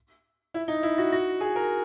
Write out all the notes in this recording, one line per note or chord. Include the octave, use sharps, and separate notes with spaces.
E4
D#4
E4
F#4
F#4
G#4
A#4